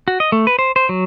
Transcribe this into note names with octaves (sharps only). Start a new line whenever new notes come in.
F#4
D#5
A3
B4
C5
C5
F#3